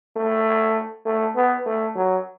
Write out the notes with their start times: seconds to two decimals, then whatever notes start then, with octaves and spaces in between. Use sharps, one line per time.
0.16 A3
1.06 A3
1.36 B3
1.66 A3
1.96 F#3